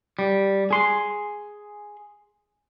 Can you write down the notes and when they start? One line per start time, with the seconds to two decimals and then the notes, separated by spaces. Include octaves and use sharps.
0.19 G3
0.71 G#4 C6